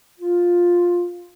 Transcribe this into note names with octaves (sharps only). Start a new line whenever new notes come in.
F4